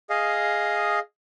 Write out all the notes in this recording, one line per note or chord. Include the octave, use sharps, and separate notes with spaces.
G#4 D#5 F5